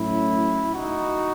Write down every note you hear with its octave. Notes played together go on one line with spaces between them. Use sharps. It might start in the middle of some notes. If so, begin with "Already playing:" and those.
Already playing: A2 F#3 C#4 E4
D#4 F#4